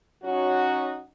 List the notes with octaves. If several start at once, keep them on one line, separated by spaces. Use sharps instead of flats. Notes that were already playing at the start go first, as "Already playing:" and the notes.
F#3 C#4 D#4 F#4